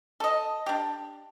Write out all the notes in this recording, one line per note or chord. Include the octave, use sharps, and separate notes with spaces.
A4 D#5
D4 G4